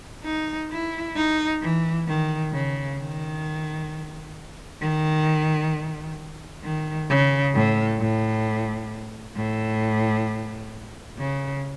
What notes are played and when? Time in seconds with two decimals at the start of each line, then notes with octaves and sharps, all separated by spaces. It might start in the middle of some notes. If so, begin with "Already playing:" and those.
0.24 D#4
0.71 E4
1.16 D#4
1.62 E3
2.07 D#3
2.53 C#3
2.99 D#3
4.81 D#3
6.63 D#3
7.09 C#3
7.54 A2
7.99 A2
9.36 A2
11.19 C#3